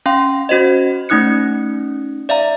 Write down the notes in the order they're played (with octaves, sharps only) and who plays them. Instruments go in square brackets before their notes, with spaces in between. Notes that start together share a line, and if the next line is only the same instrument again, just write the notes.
[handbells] C#4 F5 G5 C6
C#4 F#4 C5 D#5
A3 C#4 D#4 D#6 F#6 C#7
D5 E5 F5 A#5